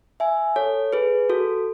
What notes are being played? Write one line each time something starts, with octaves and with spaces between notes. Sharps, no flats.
E5 G#5
A4 C#5
G#4 B4
F#4 A4